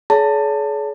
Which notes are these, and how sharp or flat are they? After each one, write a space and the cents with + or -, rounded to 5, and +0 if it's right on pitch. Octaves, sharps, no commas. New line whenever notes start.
G#4 +40 C#5 +40 A5 +25